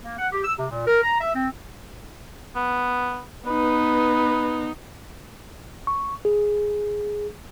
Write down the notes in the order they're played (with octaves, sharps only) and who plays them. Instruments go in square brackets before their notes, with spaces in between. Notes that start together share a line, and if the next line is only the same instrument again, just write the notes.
[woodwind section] A#3
F#5
G4
E6
C3
A#2
A#4
A#5
E5
C4
[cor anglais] B3
[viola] B3 D#4 [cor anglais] B4
[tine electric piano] C#6
G#4